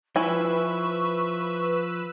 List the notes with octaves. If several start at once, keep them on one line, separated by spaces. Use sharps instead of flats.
F3 E4 B4 G#5 C#6 E6